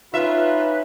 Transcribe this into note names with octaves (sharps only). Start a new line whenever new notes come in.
C#4 D#4 F4 B4 E5